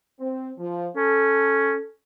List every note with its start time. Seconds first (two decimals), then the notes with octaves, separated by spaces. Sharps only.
0.20 C4
0.58 F3
0.96 C#4 A4